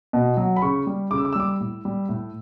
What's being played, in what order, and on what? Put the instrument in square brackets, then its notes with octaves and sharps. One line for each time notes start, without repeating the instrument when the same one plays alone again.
[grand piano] B2
F#3
B5
C#3 C#6
G3
C#3 D6
E6
D6
E6
G3 D6
A2
G3
A2